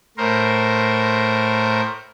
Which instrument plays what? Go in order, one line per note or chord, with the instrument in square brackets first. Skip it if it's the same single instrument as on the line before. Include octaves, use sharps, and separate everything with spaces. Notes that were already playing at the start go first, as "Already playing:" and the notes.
[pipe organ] A2 A#4 C5